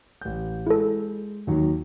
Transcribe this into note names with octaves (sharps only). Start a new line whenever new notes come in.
A1 G6
G#3 E4 A4
D#2 D#3 F#3